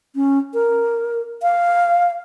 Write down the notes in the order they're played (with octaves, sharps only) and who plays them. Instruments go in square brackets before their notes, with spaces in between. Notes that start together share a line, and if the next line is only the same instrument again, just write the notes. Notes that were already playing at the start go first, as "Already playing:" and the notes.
[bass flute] C#4
A#4
F5